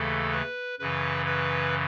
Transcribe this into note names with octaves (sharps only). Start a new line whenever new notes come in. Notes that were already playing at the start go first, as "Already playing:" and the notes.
Already playing: D#2 C#3 E3 A3 A4
B4
F#2 C#3 E3 B4
B4